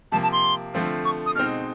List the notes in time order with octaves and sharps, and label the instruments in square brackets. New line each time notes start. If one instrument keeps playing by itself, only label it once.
[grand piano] C3 F3 A#3 [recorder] A5
[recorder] A5
C6
[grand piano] D3 F3 A3 C4 F4
[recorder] C#6
D#6
[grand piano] B2 G#3 C4 D#4 [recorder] F6